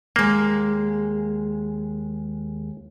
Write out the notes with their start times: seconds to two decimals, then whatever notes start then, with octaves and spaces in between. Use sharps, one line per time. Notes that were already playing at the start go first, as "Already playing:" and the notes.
0.16 D#2 G#3 A#3